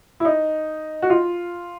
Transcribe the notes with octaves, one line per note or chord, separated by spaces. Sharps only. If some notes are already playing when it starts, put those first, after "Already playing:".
E4
D#4
F#4
F4